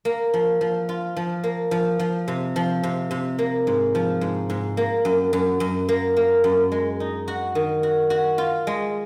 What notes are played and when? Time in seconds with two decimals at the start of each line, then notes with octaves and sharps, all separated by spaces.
0.05 A#3
0.34 F3
0.61 F3
0.89 F4
1.17 F3
1.44 A#3
1.71 F3
1.99 F3
2.28 C3
2.56 F3
2.83 C3
3.11 C3
3.38 A#3
3.67 G#2
3.95 F3
4.21 G#2
4.50 G#2
4.77 A#3
5.05 F#2
5.33 F#2
5.60 F#2
5.89 A#3
6.16 A#3
6.44 F#2
6.72 G#3
7.00 D#4
7.28 F#4
7.55 D#3
7.83 F#4
8.10 F#4
8.38 F4
8.67 G#3